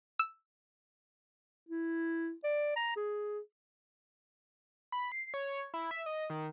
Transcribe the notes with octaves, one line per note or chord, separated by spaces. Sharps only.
E6
E4
D5
A#5
G#4
B5
C7
C#5
E4
E5
D#5
D#3